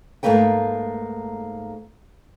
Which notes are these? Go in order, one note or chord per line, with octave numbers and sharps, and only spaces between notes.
G#2 D3 A3 A#3 B4 G5